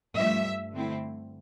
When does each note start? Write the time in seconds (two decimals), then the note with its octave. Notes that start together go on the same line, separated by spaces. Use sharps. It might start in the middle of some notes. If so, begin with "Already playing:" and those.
0.16 G2 F3 A3 E5
0.72 D3 A3 C4 E4